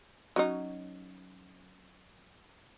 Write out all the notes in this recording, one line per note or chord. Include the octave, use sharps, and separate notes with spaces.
F#3 C#4 D#4